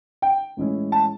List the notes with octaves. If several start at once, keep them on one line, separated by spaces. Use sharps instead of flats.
G5
A2 E3 G#3 C#4 E4
A5